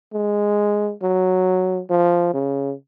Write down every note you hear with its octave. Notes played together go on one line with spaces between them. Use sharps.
G#3
F#3
F3
C#3